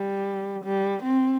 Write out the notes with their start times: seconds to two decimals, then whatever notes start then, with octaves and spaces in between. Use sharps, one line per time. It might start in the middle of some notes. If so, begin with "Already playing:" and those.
Already playing: G3
0.64 G3
1.03 C4